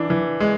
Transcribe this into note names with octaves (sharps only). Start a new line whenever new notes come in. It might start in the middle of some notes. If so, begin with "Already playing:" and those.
Already playing: E3 D4
E3
G#3